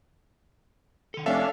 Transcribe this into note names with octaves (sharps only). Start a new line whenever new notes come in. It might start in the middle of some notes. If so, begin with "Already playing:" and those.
D#3 A4
F1 C#4 D4 A4 E5 F5